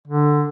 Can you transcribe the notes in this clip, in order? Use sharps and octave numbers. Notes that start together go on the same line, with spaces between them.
D3